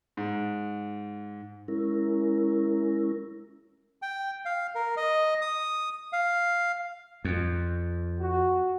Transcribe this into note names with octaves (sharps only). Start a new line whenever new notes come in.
G#2
G#3 C#4 E4 A#4
G5
F5
A#4
D#5
D#6
F5
F2
F#4